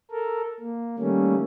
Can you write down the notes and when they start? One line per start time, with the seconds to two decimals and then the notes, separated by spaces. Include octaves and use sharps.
0.11 A4 A#4
0.60 A#3
0.99 D#3 G3 A3 A#3 C#4